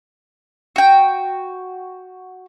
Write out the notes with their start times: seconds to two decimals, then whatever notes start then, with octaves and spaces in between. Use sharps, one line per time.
0.76 F#4 G5